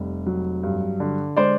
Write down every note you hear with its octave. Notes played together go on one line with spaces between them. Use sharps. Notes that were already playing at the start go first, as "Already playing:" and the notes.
Already playing: F1 G3
F#3
G2
D3
G#3 C5 D5